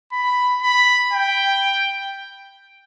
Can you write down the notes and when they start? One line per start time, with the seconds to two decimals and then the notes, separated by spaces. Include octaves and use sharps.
0.12 B5
0.63 B5
1.13 G5